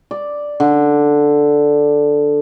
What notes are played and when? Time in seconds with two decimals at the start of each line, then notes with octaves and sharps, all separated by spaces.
0.11 D5
0.60 D3